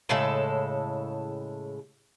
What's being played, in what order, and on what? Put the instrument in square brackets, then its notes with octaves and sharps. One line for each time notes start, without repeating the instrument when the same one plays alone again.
[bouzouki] A2 C#3 G#3 A4